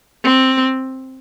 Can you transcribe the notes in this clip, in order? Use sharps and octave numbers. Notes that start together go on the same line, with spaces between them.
C4